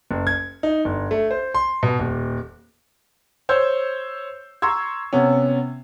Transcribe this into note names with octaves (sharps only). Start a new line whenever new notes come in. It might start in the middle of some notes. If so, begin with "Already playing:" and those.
F#1
G#6
D#4
G1
A3
C5
C6
B2
D#1
C5 C#5 E6 G6
A#5 C6 C#6 E6 G#6
C3 B3 C#4